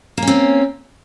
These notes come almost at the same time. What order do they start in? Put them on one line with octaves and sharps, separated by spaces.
A#3 C#4 C4